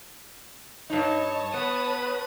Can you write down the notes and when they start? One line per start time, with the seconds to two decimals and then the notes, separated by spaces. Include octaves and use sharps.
0.90 G2 D#4 C#5 D#5 A5
1.54 B3 B4 D#6